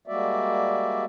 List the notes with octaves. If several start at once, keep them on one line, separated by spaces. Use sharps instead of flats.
G3 G#3 A#3 F#4 D5 E5